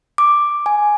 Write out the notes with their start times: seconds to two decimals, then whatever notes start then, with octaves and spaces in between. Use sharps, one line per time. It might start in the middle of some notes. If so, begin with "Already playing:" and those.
0.18 D6
0.66 G#5